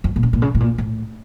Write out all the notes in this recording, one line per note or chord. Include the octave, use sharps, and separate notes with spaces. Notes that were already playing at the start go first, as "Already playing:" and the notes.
F2
A#2
C#3
A#2
C#3
A2
A#2
A2